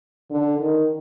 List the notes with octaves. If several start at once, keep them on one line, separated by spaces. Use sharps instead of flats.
D3
D#3